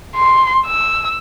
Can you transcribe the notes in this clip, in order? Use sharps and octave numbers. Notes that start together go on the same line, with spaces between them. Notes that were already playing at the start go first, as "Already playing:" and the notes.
C6
E6